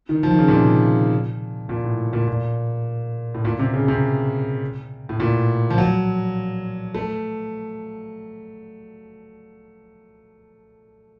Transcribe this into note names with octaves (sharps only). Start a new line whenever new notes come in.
D#3
F3
D#3
C#3
A#2
C3
A#2
A2
A#2
A#2
A2
A#2
C3
C#3
C3
A2
A#2
F3
F#3
A3